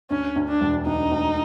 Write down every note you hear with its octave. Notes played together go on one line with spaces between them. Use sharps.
D2 C#4
D2
D4
E1
D2 D#4
D2